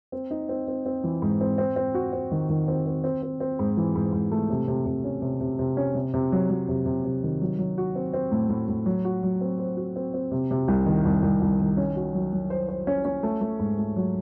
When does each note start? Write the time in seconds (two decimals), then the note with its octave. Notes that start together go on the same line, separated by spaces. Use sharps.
0.12 C4
0.31 D#4
0.49 C4
0.68 C4
0.86 C4
1.04 E3
1.22 G#2
1.41 C4
1.58 C4
1.76 C4
1.94 F#4
2.13 C4
2.31 D#3
2.49 D#3
2.68 C4
2.86 C4
3.04 C4
3.22 C4
3.40 C4
3.59 G#2
3.77 E3
3.96 G#2
4.13 G#2
4.31 A3
4.50 C3
4.68 C3
4.86 C3
5.04 C#4
5.22 C3
5.41 C3
5.59 C3
5.77 C#4
5.95 C3
6.14 C3
6.32 F#3
6.50 F#3
6.69 C3
6.86 C3
7.05 C3
7.23 D#3
7.41 F#3
7.58 F#3
7.78 F#4
7.95 C4
8.14 C4
8.32 A2
8.49 A2
8.68 A2
8.86 F#3
9.05 F#4
9.23 F#3
9.41 C4
9.59 C5
9.77 F#4
9.96 C4
10.14 C4
10.31 C3
10.51 C3
10.68 C2
10.86 D#3
11.05 C2
11.23 C2
11.41 C2
11.60 D#3
11.77 C#4
11.96 F#4
12.14 F#3
12.33 F#3
12.50 C5
12.69 C5
12.87 C#4
13.05 C#4
13.23 A3
13.41 A3
13.59 G#2
13.79 A3
13.96 F#3